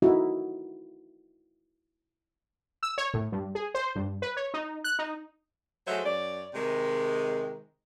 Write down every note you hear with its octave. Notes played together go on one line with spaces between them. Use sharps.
D#4 E4 F#4
E6
C#5
A2
G2
G#4
C5
G2
B4
C#5
D#4
F#6
D#4
F#3 G#3 A3 C5 E5
F#2 C#5 D5
C3 D#3 G#3